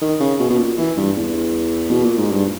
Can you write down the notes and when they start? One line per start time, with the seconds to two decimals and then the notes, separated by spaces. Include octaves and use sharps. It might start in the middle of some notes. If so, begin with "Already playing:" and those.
0.01 D#3
0.20 C#3
0.40 B2
0.50 B2
0.59 A#2
0.78 E3
0.97 G2
1.16 E2
1.91 B2
2.04 A#2
2.18 G#2
2.31 G2